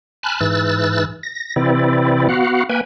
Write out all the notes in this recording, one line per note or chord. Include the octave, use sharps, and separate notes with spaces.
G#5 A5 B5 F6 F#6
G#2 E3 E6 F#6 A6
A#6
C3 E3 C4 E4 D5
B3 F#4 F5 F#5
A#3 B4 G5 G#5